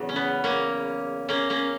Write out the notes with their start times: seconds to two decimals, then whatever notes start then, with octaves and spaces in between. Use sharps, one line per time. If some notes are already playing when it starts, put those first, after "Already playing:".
Already playing: E2 C#3 F#3
0.09 C#4
0.16 B3
0.44 A#3 C#4
1.29 A#3 C#4
1.50 A#3 C#4